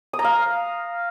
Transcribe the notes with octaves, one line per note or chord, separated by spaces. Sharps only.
D#6
A#5
F5